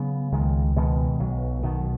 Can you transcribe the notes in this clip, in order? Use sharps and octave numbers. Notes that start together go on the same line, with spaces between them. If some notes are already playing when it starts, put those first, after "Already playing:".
Already playing: C#3 F#3 B3
C#2 D#3 G#3
B2 D#3 G#3
B1 F#3
B2 D#3